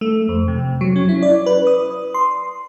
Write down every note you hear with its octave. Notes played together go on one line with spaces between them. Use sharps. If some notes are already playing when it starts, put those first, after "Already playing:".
A3
F2
C3
F#3
C#4
E4
D5
B4
D#6
C6